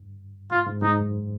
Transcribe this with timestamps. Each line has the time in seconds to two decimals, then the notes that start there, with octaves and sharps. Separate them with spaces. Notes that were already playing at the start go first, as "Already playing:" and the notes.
Already playing: G2
0.51 G#2 F4
0.66 G#2
0.82 G#2 D#4
0.97 F#2